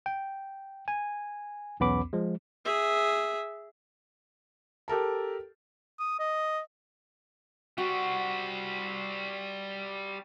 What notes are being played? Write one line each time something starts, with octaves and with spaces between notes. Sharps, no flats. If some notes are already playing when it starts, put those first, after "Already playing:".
G5
G#5
B1 E2 B3 C#4 B5 D6
F3 G#3
G#4 E5
G4 A4 A#4 A5
D#6
D#5
G3 C4 F#4